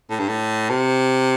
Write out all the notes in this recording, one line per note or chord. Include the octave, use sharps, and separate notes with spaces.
A2
G2
A2
C3